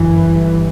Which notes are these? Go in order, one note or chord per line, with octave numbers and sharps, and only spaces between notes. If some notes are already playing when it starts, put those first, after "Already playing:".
Already playing: G1 F#2 E3
G1 G2